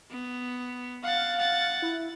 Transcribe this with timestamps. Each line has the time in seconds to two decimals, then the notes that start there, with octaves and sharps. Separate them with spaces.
0.11 B3
1.03 F5 F#5 A6
1.38 F#5 A6
1.82 E4